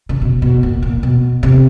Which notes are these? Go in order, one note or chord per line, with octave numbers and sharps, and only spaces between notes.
C#3
B2
B2
A#2
A#2
B2
C3